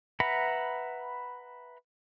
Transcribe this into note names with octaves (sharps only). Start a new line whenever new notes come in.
B4 E5 F#5 A#5 B5